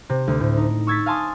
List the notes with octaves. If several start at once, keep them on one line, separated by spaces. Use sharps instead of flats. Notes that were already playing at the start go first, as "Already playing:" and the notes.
C3
D2
A2
D#4
C#6 E6 G#6 A6 B6
F5 G#5 A5 C6 D#6